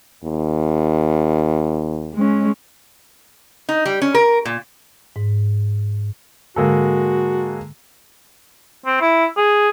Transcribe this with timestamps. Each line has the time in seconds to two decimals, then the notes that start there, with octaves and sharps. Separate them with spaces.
0.24 D#2
2.15 G#3 C#4
3.69 D#4
3.85 G3
4.02 C#4
4.14 A#4
4.45 A#2
5.16 G#2
6.56 G#2 D3 G#3 A#3 F#4 A4
8.86 C4
9.01 E4
9.37 G#4